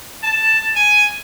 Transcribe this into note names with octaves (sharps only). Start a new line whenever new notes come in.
A5
G#5